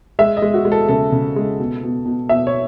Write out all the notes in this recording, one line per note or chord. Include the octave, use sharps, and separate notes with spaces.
G#3 E5
D#5
G#3
F#4
G#3
A4
C#3 A4
C#3
G#3
B2
B2
B2
B2 E5
C#5